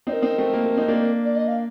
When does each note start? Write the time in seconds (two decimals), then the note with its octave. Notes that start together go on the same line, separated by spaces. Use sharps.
0.07 C4 D#4 D5
0.12 A#4
0.22 C4 D#4
0.38 A3 C4
0.53 A#3
0.66 A#3
0.77 C4 D#4
0.88 A#3 D4
1.00 A#4
1.25 D5
1.36 D#5
1.48 F5